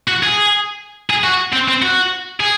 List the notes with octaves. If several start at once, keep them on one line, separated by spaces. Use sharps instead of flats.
F#4
G#4
G#4
F#4
C4
C4
F#4
G#4